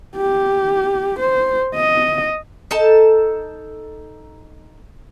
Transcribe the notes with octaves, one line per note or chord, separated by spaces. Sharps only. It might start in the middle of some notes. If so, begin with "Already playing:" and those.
G4
C5
D#5
D#4 A4 A5